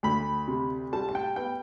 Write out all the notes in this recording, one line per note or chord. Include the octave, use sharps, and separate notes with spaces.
D2 B5
C3
G3 A5
A5
G5
B3 G5